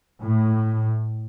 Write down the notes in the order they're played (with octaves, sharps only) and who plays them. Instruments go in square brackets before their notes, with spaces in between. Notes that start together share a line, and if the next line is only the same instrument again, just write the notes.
[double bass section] A2